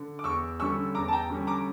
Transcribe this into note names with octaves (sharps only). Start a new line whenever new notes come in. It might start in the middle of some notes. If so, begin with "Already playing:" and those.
Already playing: D3
D6
E2 C#6 E6
D3 G3 C#4 C#6 E6
E2 A#5 D6
A5
G5 A#5
D3 G3 C#4
A#5 D6